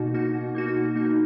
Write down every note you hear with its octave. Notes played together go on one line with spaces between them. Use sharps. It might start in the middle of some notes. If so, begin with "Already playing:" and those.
Already playing: B2 A#3 D#4 F#4
A#3 D#4 F#4
B2
A#3 D#4 F#4
B2
A#3 D#4 F#4